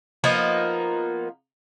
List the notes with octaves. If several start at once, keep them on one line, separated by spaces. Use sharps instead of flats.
F3 A#3 B3 D#4